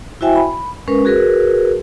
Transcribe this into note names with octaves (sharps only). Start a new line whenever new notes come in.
E4 F#4 C5 E5 G5 G#5
B5
G#3 C#4 A#4 B4
F#4 G#4 A#4 B4